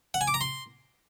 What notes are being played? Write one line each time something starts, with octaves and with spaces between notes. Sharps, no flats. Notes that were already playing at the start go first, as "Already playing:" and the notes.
F#5
G#5
D6
A#5
C6